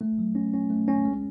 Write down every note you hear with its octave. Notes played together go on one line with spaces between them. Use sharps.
A3
F#3
C#4
C#4
A3
C#4
G#3